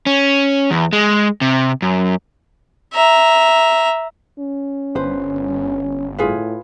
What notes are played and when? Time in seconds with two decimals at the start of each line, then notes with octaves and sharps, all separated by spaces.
0.06 C#4
0.71 E2
0.93 G#3
1.41 C3
1.82 F#2
2.93 E5 A#5
4.39 C#4
4.95 G1 B4 C5
6.18 A2 F4 G#4 B4